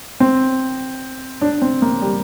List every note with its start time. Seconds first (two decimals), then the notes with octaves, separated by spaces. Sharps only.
0.20 C4
1.41 D4
1.62 C4
1.82 A#3
2.02 G3